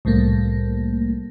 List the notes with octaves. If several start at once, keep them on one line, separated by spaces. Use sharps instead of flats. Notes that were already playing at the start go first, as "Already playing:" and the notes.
C2 A2 G3 A3 A#3